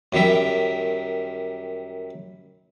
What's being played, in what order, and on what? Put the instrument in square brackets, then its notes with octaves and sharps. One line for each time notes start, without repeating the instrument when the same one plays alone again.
[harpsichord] F#2 D#3 G3 E5